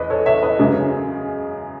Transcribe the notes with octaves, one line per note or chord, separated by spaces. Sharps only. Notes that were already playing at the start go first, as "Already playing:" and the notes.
Already playing: E2 B4 D#5
A4 C#5
C#5 E5
C#5
B4 D#5
F#2 C#3 G#3